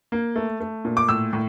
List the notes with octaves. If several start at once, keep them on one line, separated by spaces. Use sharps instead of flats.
A#3
A3
A3
A#2
D6
A2 E6
A2